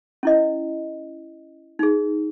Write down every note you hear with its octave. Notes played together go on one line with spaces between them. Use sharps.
C#4 E4 D#5
D#4 G#4